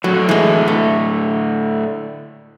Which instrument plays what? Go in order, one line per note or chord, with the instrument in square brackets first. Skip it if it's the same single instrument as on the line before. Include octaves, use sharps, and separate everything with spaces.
[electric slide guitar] A2 D3 [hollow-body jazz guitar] F#3
[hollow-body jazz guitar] E3 G#3
A3